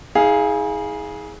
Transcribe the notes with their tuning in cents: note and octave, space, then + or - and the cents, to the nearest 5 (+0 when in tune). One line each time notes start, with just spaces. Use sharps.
E4 -45 G#4 +0 F5 +0